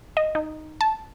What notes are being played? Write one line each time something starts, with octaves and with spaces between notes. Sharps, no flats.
D#5
D#4
A5